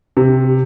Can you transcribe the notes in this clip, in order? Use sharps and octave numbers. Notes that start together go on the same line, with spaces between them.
C3